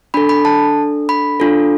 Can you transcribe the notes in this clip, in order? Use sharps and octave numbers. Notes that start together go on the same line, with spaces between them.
D4 A4 B5
B5
A5
B5
D4 F4 A4